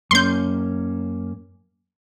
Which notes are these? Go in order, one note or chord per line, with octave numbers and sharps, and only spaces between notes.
F#2 A#3 C#4 C6 G6